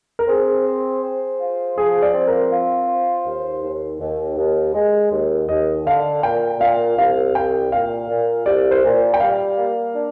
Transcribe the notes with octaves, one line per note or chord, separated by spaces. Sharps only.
A#4
C4 G#4
C5
C5
F4
F3 G#4
D5
C4
A#4
F4
C5
D#2
D#2
D#2
D#2
G#3
D#2
D#2 D#5
D3 F5
A#2 G5
A#2 F5
C2 F5
C2 G5
A#2 F5
A#2
C2 D5
C5
A#2
G5
G3 F5
A#3
D4